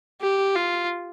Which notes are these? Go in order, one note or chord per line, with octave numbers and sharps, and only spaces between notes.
G4
F4